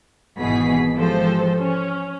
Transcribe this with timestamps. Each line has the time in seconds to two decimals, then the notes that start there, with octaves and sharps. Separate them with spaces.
0.38 G#1 B2 E3 G#4 B6
0.94 E3 F3 G#3 G4 A4 C5
1.57 C#4